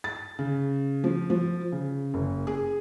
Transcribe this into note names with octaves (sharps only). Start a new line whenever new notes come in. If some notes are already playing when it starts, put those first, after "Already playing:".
A6
C#3
F3
F3
C#3
F#1
G#4